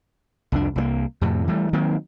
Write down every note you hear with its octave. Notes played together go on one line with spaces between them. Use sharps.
C2 F2 D4
C2 F#3 A#3
F2 A2 C3
E3 G3 A3
D#3 F#3 A#3 C4